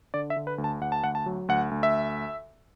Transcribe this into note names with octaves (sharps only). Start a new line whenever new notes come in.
D3 D5
E5
D3
B4
D2
A5
D2 F#5
A5
D2 F#5
A5
F#3
D2 F#5
D2
E5